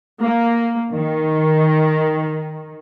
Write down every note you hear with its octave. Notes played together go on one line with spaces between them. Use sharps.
A#3
D#3